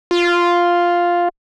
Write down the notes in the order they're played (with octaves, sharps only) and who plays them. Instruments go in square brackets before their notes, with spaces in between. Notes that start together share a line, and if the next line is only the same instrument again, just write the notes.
[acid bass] F4